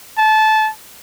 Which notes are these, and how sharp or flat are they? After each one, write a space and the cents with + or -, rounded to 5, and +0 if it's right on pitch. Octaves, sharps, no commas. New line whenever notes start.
A5 -20